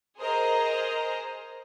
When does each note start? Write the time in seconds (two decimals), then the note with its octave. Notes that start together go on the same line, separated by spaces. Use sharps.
0.19 G#4 A#4 C5 D#5 A#5